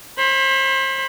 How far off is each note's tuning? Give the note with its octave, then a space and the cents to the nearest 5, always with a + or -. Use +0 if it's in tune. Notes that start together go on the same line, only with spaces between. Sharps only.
C5 +35 B5 +0